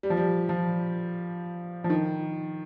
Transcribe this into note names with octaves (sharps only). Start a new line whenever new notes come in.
G3
F3
G3
F3
F3
D#3